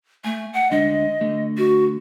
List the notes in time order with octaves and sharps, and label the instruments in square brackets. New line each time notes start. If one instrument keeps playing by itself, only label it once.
[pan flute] A3 [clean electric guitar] G#5
[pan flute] F#5
[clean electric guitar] D2 G#3 D4 [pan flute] D#5
[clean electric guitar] D3 A3
[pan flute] F#4